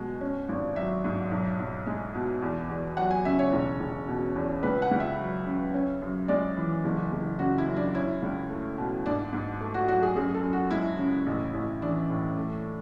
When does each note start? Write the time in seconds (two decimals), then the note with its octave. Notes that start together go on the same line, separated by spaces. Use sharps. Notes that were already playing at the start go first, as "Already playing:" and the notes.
Already playing: B2 G#3
0.21 C#4
0.49 G#1
0.76 F#3 E5
1.04 G#2
1.31 B1
1.59 B1
1.87 G#3
2.15 B2
2.42 E2
2.69 E2
2.97 F#3 F#5
3.11 G#5
3.25 C#3 E5
3.39 C#5
3.53 E1
3.80 E1
4.08 B2
4.36 E2
4.63 C#2 B4
4.82 F#5
4.91 C#2
5.00 E5
5.19 F#3
5.46 C#3
5.74 C#4
6.01 F#2
6.28 G#3 D5
6.57 E3
6.85 F#1
7.12 F#1
7.39 C#3 F#4
7.58 E4
7.67 F#2
7.76 D4
7.95 C#4 E4
8.22 C#2
8.49 A3
8.78 B2
9.05 G#2 D4
9.33 G#2
9.61 A3
9.74 F#4
9.88 F#3 F#4
10.03 G#4
10.16 F#2 G#4
10.34 A4
10.43 F#2
10.53 F#4
10.70 G#3 E4
10.98 C#3
11.26 A1
11.54 A1
11.81 E3 D4
12.09 A2
12.37 A3